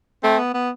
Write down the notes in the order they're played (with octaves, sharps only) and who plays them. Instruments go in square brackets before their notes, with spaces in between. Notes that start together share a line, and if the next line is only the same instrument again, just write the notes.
[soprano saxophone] A3 [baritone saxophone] C4
[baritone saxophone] B3
B3